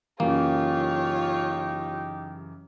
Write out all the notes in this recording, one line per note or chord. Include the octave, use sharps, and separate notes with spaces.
F#2 C#3 E3 A#3 D#4 F4 G4 C#5